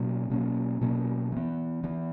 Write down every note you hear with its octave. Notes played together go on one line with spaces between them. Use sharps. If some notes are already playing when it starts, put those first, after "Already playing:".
Already playing: B2 F#3 A#3 C#4
B2 F#3 A#3 C#4
B2 F#3 A#3 C#4
E3 B3
E3 B3